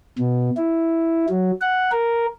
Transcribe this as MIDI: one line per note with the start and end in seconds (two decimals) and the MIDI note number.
0.19 0.50 47
0.57 1.26 64
1.29 1.51 54
1.61 1.91 78
1.91 2.26 70